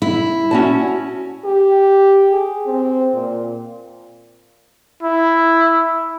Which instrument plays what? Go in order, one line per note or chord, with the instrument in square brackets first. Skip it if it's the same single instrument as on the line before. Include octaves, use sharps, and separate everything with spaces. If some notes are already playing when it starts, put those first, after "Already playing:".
[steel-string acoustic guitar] E4
[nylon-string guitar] C#4 F#4 A5
[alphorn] G4
G#4
C4
A#2
[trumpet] E4